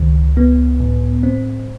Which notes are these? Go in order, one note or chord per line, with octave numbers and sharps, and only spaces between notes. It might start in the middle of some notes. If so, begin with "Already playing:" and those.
Already playing: C#2 D#3
B3
A2
C4